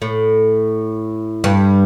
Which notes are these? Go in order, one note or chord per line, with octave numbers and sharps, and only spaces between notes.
A2
G2